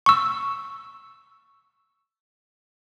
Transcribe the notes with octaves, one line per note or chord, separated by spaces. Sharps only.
C#6 E6